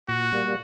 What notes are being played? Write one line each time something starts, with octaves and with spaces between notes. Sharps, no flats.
A#2 F#4
G3 A#3